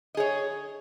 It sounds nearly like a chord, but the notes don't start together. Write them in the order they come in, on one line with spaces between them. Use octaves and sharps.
D#5 G#4 C#5